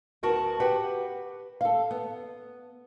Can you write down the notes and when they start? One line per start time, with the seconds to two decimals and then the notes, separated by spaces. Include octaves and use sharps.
0.23 D2 B3 F#4 A#4 A5
0.60 G4 B4 F#5
1.61 A4 F5
1.91 B3